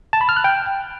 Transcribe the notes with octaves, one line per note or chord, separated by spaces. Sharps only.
A5
B5
F6
F#6
G5